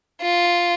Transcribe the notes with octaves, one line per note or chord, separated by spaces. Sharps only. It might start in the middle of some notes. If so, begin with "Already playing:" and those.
F4